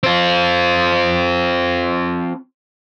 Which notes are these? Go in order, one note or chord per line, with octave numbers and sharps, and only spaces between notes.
C4 F4